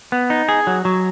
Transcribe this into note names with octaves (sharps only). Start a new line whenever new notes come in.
B3
D#4
G#4
F#3
F#3